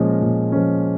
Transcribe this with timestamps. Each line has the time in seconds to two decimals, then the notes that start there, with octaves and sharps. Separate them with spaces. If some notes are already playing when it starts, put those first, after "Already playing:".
Already playing: A#2 F3 G#3 C#4
0.22 A#2
0.52 F3 G#3 C#4